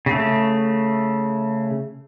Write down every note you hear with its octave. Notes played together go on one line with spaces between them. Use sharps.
C#3 A3